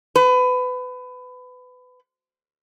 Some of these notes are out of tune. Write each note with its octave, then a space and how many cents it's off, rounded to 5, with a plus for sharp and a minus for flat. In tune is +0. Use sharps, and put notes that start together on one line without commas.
B4 +25